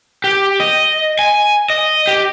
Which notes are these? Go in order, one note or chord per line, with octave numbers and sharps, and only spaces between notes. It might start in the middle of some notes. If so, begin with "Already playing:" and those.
G4
D#5
G#5
D#5
G4